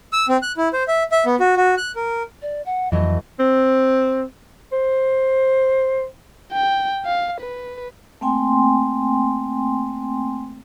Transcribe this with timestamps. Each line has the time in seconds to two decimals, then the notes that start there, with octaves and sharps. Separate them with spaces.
0.13 E6
0.29 C4
0.42 F#6
0.57 E4
0.73 C5
0.88 E5
1.12 E5
1.26 B3
1.40 F#4
1.56 F#4
1.77 F#6
1.96 A#4
2.42 D5
2.66 F#5
2.92 F2 E3 F#3 A3 D#5
3.39 C4
4.72 C5
6.53 G5
7.05 F5
7.41 B4
8.21 A3 A#3 C4 G5 G#5 C6